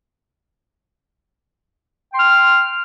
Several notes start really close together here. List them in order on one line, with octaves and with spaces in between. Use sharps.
G5 C6 F6